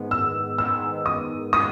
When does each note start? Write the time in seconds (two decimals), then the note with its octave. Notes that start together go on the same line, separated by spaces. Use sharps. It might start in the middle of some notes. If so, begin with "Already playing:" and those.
Already playing: G#2 D#3 G#3 B3
0.11 E6
0.58 G#2 D#3 G#3 B3 E6
1.06 D#6
1.53 D#3 G#3 B3 D#6